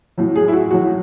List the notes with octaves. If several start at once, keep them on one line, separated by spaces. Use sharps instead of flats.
A2 F#3
G#4
E4
F#4
A2 F#3 F#4